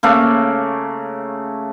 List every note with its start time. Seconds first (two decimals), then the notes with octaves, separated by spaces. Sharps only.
0.03 C#3 A3 A#3